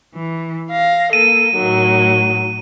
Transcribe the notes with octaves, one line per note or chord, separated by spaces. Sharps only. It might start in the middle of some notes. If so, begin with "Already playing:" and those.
E3
F5 A#6
A#3 A4 D#7
A2 D#3 F#3